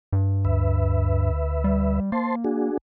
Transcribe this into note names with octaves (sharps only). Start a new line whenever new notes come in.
G2
D2 B4 E5
G3
A#3 C5 A5 C6
D4 F#4 G#4